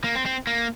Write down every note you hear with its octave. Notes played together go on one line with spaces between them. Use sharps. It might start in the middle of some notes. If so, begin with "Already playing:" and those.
A#3
C4
C4
A#3